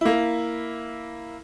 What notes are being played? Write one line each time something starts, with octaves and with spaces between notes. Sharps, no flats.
A#3 E4